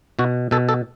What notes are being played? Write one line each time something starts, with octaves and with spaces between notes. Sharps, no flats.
B2 F#4
B2 A4
A4